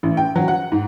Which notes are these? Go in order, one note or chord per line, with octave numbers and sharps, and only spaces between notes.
A1
G5
F#3
F#5
G#2